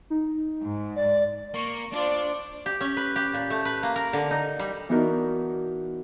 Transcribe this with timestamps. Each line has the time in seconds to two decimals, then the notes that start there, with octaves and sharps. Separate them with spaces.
0.10 D#4
0.62 G#2
0.96 D5
1.54 A#3 C#6
1.93 D4 F4 C5 D5
2.66 G4
2.81 C#4
2.97 B4
3.16 G4
3.34 A#2
3.50 A3
3.65 B4
3.83 A#3
3.96 A#4
4.13 D3
4.31 D#4
4.59 G3
4.89 E3 B3 D4 D#4 F#4 A#4